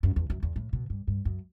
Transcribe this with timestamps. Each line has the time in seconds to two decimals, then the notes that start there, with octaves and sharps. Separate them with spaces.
0.03 F#2
0.16 E2
0.30 F#2
0.43 E2
0.56 A2
0.73 B2
0.90 G2
1.07 G2
1.25 F#2